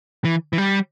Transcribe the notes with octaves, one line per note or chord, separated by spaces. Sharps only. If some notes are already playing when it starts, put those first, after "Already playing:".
E3
E3
G3